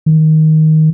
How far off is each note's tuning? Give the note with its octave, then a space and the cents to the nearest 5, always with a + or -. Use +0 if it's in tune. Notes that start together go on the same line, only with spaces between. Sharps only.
D#3 +10